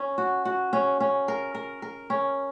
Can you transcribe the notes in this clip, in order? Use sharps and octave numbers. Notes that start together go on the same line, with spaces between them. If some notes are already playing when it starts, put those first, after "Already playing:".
Already playing: C#4
F#4
F#4
C#4
C#4
A#4
A#4
A#4
C#4